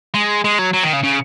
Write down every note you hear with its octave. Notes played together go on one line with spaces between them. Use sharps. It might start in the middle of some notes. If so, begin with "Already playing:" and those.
G#3
G#3
F#3
F#3
D#3
C#3
C#3